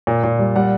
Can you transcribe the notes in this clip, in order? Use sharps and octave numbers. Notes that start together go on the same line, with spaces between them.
A#2
A#2
G3
G3 F#5